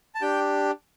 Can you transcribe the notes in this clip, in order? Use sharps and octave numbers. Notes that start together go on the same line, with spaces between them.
A5
D4 G4 G5